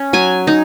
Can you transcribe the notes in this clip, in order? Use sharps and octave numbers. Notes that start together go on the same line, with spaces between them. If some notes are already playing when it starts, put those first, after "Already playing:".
Already playing: C#4
F#3 G#5
D#4